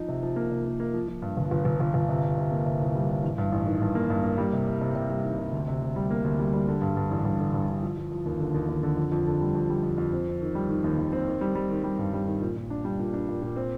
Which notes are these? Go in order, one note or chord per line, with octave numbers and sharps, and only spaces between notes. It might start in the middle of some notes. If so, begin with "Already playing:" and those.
Already playing: F3 D#4
C3
F3
A#3
C3
A#3
A#3
F3
F3
G2
G1
G1
G1
G1
G1
C3
C3
C3
A#3
C3
C2
G3
C3
A1
G2
A1
D#3
G2
A#3
G2
A#3
G3
C3
C3
C3
C3
G3
D#3
C3
D2
C3
D2
G3
A#3
D2
G3
G3
D3
G2
G2
A1
G2
D3
G2
D3
F3
F3
F3
D#2
D3
D#2
D#2
D3
F2
F2
D3
G3
F2
G3
F2
F2
C4
C4
D#3
G3
D#3
D#2
D#2
C4
D#3
G3
G3
D#3
G3
G2
G3
D#3
A#2
A#2
D4
G3
A#2
D4
A#2
A#2
C4